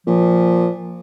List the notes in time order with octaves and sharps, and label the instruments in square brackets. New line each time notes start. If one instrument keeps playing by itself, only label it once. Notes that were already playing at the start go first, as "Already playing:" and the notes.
[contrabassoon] A#2 [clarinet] F3